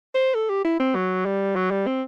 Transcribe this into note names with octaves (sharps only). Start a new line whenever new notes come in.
C5
A4
G4
E4
C4
F#3
G3
F#3
G3
C4